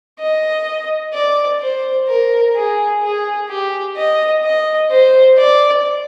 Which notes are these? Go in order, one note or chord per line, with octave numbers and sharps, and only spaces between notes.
D#5
D5
C5
A#4
G#4
G#4
G4
D#5
D#5
C5
D5